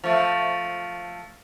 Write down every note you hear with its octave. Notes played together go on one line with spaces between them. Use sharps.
F3 A3